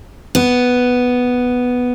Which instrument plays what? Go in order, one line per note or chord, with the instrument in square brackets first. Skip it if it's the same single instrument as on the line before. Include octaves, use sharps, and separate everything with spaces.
[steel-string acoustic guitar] B3